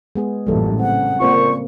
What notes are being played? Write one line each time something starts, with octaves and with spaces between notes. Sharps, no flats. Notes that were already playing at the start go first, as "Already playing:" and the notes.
G#3 B3 G#4
A1 F#2 A#2 G3 A4
C#3 C4 F#5
A#2 A#3 C4 F4 C5 C#6